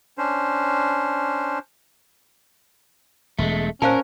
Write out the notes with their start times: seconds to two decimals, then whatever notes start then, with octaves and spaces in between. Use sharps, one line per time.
0.18 C#4 D4 C5
3.39 E1 G#3 A3
3.82 A#2 C#4 A#4 C5 F5 A5